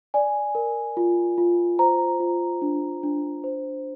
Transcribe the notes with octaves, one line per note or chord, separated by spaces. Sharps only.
D5 G#5
A#4
F4
F4
C5 A#5
F4
D4
D4
C5